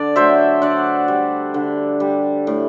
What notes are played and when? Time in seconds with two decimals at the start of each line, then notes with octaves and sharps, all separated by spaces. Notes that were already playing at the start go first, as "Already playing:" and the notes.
Already playing: D3 D5
0.16 F#3 A3 C5 E5
0.62 D3 D5 F#5
1.08 G3
1.54 D3
2.00 G3
2.47 A2